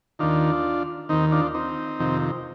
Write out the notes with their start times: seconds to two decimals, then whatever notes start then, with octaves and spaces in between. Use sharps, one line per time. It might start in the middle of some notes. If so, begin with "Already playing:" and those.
0.19 D#2 D#3 D4 F4
1.09 D#2 D#3 C4 D#4
1.32 D4 F4
1.54 C4 D#4
1.99 F2 C3 D#3